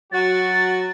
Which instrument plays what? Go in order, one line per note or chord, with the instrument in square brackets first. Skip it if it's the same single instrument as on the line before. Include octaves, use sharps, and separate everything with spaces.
[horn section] F#3 F#4 [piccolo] A6